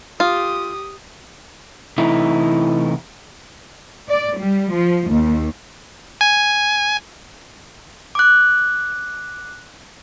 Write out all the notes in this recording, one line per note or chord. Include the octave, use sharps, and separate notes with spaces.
F4 G4 D#6
C3 E3 A3 D#4 E4
D5
G3
F3
D#2
G#5
D6 F#6